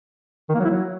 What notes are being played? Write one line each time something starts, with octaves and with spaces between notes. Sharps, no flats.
D#3
A#3
F#3
E4
F#3